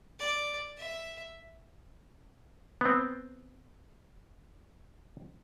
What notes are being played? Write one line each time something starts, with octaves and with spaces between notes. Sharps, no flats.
D5
E5
B3 C4